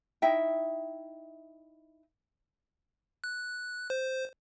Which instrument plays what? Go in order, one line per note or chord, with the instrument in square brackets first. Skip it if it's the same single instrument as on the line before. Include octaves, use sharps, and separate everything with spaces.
[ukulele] D#4 E4 E5 G5
[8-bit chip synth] F#6
C5